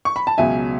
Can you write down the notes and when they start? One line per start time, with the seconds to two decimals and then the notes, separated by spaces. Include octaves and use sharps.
0.05 C#6
0.16 B5
0.27 A5
0.38 C#2 B2 F#3 E5 G#5